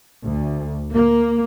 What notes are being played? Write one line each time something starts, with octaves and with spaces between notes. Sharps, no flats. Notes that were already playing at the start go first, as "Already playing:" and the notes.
D2
A#3